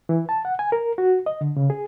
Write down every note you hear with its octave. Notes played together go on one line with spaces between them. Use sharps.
E3
A5
F#5
G#5
A#4
F#4
D#5
D3
C#3
G#4